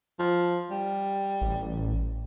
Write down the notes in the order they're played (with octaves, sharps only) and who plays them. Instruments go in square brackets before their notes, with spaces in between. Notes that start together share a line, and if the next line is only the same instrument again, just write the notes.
[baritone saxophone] F3
G3
[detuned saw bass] A1